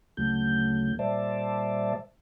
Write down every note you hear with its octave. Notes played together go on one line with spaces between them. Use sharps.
D2 C#3 F#3 A3 G6
A#2 G3 C5 D5 E5 A5